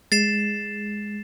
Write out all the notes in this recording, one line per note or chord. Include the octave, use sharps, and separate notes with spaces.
G#3 A6 C7 E7